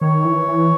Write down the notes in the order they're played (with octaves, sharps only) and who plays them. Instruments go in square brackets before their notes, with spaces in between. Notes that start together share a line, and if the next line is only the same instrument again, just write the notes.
[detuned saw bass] D#3 [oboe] C#5
[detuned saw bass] E3
E3